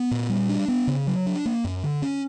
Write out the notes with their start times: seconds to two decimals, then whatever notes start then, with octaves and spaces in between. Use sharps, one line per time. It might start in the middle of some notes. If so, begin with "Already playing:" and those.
Already playing: B3
0.11 A#2
0.29 G3
0.49 D4
0.68 B3
0.87 C#3
1.07 F#3
1.26 D4
1.45 A#3
1.64 F#2
1.83 D3
2.02 C#4